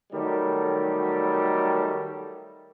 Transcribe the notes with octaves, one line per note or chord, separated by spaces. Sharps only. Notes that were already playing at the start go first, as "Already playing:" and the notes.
D#3 F#3 G3 A3